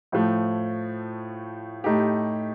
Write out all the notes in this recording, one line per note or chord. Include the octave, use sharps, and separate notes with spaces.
A2 F3 A3
A2 A3 D#4 G4